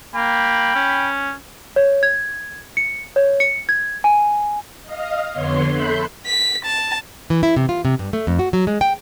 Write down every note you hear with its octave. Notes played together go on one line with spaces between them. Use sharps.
A#3 G5 B5
C#4
C#5
G#6
C#7
C#5
C#7
G#6
G#5
D#5 F5
F2 D3 B3 C#5 C6
A4 E5 B5 C6 F#6 G6
B6
A5
E3
E4
C3
F4
C3
G2
A3
F2
F#4
F#3
G#3
G5